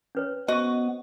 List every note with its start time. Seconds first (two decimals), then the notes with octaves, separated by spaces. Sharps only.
0.15 C#4 B4 C#5
0.48 B3 F#4 C5 D#5 C#6